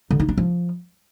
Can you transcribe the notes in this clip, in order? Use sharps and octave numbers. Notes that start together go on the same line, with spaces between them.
D3
D#4
D4
F3